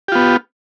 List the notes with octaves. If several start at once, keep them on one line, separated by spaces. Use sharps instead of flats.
B3 F4 G4